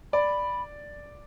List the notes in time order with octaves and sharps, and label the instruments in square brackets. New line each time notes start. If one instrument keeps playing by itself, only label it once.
[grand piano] D5 [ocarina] B5